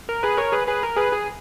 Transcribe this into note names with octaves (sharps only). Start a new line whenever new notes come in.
A#4
G#4 B4
A#4 C#5
G#4 B4
G#4 B4
A#4
G#4 B4
G#4